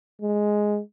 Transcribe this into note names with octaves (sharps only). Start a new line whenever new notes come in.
G#3